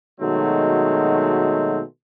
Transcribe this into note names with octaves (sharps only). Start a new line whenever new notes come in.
B2 D#3 F#3 G#3 A3 C4